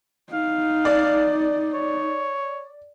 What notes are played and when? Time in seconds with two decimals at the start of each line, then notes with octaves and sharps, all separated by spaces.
0.33 D#4 F5
0.85 D5
1.74 C#5